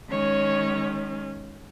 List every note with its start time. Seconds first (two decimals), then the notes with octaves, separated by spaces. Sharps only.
0.10 D#3 G#3 C#4 C#5